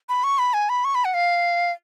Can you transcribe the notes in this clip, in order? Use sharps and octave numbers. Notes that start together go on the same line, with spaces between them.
B5
C#6
B5
G#5
B5
C#6
B5
F#5
F5